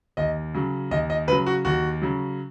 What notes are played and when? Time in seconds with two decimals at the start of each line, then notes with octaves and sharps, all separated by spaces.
0.17 D#2 D#5
0.54 C#3 F#3
0.91 D#2 D#5
1.10 D#5
1.28 C#3 F#3 B4
1.46 F#4
1.65 D#2 F#4
2.02 C#3 F#3